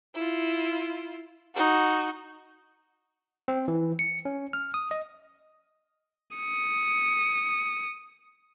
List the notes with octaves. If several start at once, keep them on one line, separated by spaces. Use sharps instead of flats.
E4 F4
D#4 F#4
C4
E3
C#7
C#4
F6
D#6
D#5
D#6 C#7